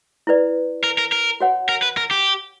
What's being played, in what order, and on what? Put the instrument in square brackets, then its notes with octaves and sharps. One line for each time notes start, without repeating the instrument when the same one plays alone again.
[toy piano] E4 B4 D5
[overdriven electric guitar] A#4
A#4
A#4
[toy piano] F#4 C#5 F#5
[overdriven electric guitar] A#4
B4
A#4
G4